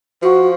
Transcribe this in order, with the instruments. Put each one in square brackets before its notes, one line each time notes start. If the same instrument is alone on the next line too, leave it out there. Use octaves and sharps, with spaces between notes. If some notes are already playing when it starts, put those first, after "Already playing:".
[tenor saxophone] F3 [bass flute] F#4